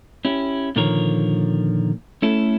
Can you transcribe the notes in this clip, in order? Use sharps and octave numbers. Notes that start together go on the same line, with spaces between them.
C#4 E4 G4
A#2 D3 D#3 F3 A#4 C#5
A3 C#4 E4 A4